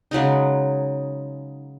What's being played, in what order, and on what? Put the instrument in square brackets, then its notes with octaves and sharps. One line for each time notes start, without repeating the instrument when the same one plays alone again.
[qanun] C#3 F#3 G#3 D#4